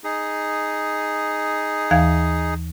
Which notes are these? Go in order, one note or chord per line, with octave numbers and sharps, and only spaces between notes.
D#4 G#4
D#2 E3 F5